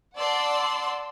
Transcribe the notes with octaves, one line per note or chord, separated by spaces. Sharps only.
D5 F#5 A5 C6 E6